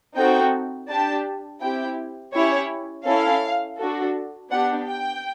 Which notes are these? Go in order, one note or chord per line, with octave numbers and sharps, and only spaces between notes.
C4 D#4 F#4 A4 G5
D4 G4 A5
C4 E4 G4 G5
C#4 E4 G4 C#5
C#4 E4 A4 F5
D4 F#4 A4
B3 D4 G4 F#5
G5